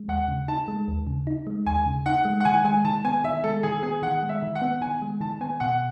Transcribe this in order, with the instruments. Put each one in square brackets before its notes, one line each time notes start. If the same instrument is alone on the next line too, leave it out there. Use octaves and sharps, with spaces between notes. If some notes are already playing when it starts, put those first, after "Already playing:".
Already playing: [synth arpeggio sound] G#3
[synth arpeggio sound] D#2 [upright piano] F#5
[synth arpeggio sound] C#3
[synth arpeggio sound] D#4 [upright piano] A5
[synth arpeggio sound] G#3
D#2
C#3
D#4
G#3
[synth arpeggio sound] D#2 [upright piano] G#5
[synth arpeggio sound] C#3
[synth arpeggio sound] D#4 [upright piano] F#5
[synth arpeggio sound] G#3
[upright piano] F#5
[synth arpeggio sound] D#3 [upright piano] G#5
[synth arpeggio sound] G#3 [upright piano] G#5
[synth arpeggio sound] D#3 [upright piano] A5
[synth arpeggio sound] B3 [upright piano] G#5
[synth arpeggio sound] D#3 [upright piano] E5
[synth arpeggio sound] G#3 [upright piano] A4
[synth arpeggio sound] D#3 [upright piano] G#4
[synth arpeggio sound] B3 [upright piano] G#4
[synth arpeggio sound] D#3 [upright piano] F#5
[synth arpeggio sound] G#3
[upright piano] E5
[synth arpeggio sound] D#3
[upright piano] F#5
[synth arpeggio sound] B3
[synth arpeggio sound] D#3 [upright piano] G#5
[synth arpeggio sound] G#3
[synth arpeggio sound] D#3 [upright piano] A5
[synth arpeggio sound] B3 [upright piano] G#5
[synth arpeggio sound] B2 [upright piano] F#5